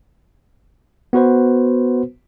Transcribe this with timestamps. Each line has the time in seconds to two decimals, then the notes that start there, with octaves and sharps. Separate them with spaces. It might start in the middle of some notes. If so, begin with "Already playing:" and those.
1.13 B3 F#4 B4 C5